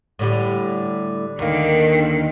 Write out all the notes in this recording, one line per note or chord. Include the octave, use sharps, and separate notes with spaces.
A2 D3 G3
D#2 D3 D#3 A#3